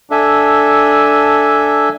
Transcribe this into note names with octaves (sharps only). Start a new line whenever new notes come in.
D4 A4 E5 G#5